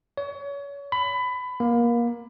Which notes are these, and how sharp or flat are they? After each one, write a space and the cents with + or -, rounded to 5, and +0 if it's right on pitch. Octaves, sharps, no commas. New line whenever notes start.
C#5 +30
B5 +20
A#3 +25